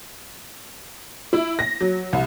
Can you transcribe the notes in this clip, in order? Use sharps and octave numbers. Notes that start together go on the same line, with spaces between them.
E4
A#6
F#3
C2